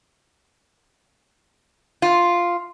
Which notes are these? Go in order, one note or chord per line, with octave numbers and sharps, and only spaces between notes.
F4